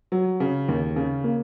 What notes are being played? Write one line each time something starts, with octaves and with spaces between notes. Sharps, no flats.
F#3
C#3
D#2
C#3
A#3